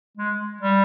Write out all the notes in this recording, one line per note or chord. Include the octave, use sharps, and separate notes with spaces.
G#3
G3